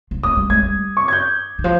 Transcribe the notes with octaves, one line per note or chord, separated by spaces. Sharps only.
F3
A#3 D#6
G3
G#3 G#6
G3
C#6
G#6
G6
D#3
F3